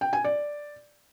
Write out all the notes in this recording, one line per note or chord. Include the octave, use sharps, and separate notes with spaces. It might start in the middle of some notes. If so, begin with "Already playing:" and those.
G5
G#5
D5